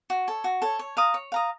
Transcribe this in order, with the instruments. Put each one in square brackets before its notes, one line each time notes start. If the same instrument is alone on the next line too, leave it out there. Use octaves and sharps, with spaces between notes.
[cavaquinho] F#4
A4 C#5
F#4
A4 C#5
C#5
F5 A#5 D#6
C#5
F5 A#5 D#6